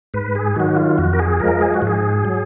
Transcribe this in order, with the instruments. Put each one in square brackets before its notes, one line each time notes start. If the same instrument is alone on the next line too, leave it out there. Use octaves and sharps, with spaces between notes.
[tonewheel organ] G#2 B4
G#4
D#3 F#3 F#4
F4
F2 F#4
A#4
G#4
F3 G#3 A#4
G#4
F#4
G#2
G#4
F#3